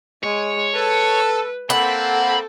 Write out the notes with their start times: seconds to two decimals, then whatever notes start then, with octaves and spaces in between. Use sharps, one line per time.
0.23 G#3 C#5
0.74 A4 B4
1.70 A#3 C4 A4 F#5 B5